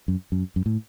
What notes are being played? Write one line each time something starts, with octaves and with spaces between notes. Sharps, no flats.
F#2
F#2
F#2
A2